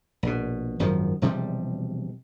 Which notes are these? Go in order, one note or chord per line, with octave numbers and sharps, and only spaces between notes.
A#1 B2
G#1 F#2 D#3 F3
E1 C3 F3 G3